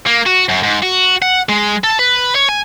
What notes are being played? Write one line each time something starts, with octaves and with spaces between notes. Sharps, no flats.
A#3
F#4
F#2
G#2
F#4
F#5
G#3
A4
B4
C#5
G#5